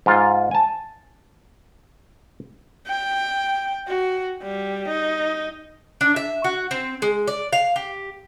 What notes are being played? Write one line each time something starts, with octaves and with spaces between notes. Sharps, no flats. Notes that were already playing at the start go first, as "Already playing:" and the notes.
G#2 F4
G#5 A5
G5
F#4
G3
D#4
D4
E5
F#4
C4
G#3
D5
F5
G4